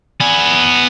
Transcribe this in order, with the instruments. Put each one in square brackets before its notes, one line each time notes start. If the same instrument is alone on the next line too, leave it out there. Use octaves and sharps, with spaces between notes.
[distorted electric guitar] B3 G#5